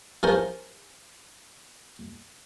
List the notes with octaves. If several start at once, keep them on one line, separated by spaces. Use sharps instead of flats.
F3 C#4 A#4 C5